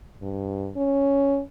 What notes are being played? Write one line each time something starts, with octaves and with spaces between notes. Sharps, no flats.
G2
C#4